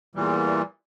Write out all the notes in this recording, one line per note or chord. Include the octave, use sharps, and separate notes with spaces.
E2 A#2 E3 G3